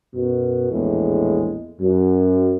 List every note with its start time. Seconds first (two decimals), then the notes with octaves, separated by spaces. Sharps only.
0.15 F#2 B2
0.71 A#1 E2 A2 G#3
1.81 F#2